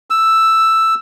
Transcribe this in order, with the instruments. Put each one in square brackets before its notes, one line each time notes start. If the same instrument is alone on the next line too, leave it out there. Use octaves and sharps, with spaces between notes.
[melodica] E6